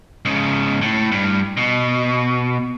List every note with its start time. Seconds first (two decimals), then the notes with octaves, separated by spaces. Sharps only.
0.25 G#2 C#3
0.81 A2
1.11 G2
1.57 B2